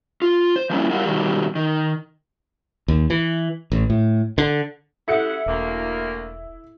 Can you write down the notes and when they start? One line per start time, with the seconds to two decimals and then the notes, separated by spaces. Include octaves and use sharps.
0.22 F4
0.56 C5
0.70 F3 G3 A#3 C4 C#4 E4
0.90 G3 E4 G4 A#4 F5 F#5
1.06 B2 D#3 F#3 G3
1.55 D#3
2.88 D#2
3.10 E3
3.72 A1
3.90 A2
4.38 D3
5.08 F#2 E4 G4 A4 F#5 D#6 C#7
5.46 E1 D2 A#3